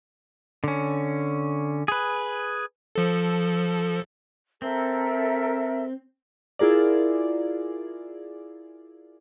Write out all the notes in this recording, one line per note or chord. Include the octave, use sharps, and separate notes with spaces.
D3 C#4
G#4 B4
F3 A4
C4 A4 A#4 E5
E4 F4 G#4 A#4 D5